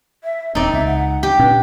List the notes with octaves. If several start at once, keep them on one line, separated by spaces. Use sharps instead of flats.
E5
D#1 C4 D#4 D5
C#2 E5
F#5
G4
A#2 C#4 D4 B4